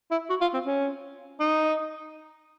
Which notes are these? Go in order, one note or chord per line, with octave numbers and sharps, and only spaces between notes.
E4
F#4
F4
C4
C#4
D#4